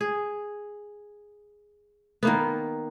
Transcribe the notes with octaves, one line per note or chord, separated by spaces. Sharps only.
G#4
D#3 A#3 B3